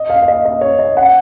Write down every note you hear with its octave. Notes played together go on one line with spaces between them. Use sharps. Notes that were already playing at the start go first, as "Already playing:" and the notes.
Already playing: D#5
F5
F5
D#5
D#5
C#5
D#5
F#5